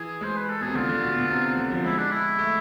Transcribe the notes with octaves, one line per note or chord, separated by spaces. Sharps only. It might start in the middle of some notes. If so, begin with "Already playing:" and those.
Already playing: E3 G#4
G#3 C5
B4
A4
B2 G#4
C3
D3 F4
D3
B2
B2
C3
C3
D3
F3
G#3 E4
D4
E4
A3